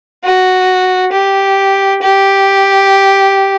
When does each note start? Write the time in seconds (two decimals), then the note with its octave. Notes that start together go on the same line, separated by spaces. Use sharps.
0.24 F#4
1.12 G4
2.02 G4